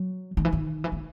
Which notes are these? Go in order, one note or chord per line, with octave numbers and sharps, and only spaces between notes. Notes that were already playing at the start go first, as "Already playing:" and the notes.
Already playing: F#3
D#3
E3
D#3
E3
D#3